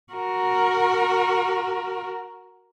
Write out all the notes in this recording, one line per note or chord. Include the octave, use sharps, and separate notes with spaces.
F#4 A#4